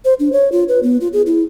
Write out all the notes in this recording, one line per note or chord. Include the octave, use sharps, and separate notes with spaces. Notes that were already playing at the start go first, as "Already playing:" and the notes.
C5
D4
C#5
F4
B4
B3
F4
G#4
E4